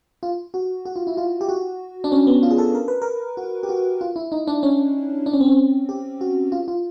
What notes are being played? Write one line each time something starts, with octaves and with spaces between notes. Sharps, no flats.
F4
F#4
F#4
F4
E4
F4
G4
F#4
D4
C#4
B3
F4
G#4
A4
A#4
B4
A#4
F#4
G4
F#4
F4
E4
D#4
D4
C#4
D4
C#4
C4
C#4
G4
F#4
F4
F4